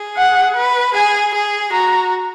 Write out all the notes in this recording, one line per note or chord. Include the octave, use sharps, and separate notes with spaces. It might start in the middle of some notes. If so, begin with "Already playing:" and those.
Already playing: G#4
F#5
B4
G#4 G#5
G#4
F#4 A#5